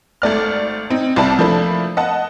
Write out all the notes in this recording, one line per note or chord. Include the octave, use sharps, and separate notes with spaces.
G#1 A3 D5 F6
C4 D#4
C2 C3 E4 D5 A5
F3 A3 A#3 D4 E4
D#5 F#5 A5